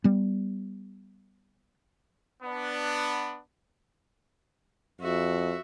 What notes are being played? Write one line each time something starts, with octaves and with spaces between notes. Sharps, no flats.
G3 B3
B3 D4
F2 F#4 E5